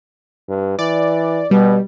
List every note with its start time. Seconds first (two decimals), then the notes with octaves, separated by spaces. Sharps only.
0.48 G2
0.79 E3 D5
1.51 B2 G3